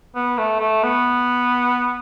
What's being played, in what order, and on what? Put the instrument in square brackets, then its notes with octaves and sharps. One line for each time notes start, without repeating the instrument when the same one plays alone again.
[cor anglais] B3
A3
A3
B3